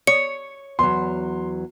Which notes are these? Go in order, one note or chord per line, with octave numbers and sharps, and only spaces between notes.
C#5 C#7
E2 F#3 C6